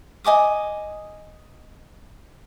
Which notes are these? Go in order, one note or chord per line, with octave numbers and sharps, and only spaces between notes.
D#5 G#5 D6 D#6